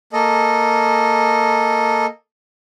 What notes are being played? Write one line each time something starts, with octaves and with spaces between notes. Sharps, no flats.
A#3 A4 D#5